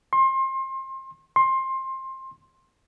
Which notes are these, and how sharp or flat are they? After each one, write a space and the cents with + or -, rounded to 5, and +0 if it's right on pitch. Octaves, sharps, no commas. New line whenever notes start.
C6 +30
C6 +20